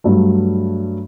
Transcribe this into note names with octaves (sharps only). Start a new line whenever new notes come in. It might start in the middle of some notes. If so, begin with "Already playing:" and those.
G2 F#3 A3